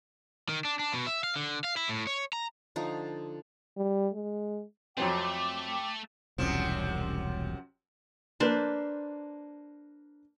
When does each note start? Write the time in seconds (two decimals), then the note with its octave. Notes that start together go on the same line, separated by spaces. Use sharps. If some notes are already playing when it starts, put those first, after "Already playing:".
0.49 D#3
0.65 D4
0.79 D4
0.94 B2
1.07 E5
1.24 F5
1.36 D3
1.64 F5
1.77 E4
1.89 A2
2.07 C#5
2.33 A#5
2.76 D3 F3 D#4
3.77 G3
4.14 G#3
4.97 F2 F#3 A3 C4 G5 D6
6.38 E1 C2 F#2 C3 F3
8.40 A#3 D4 B4 C5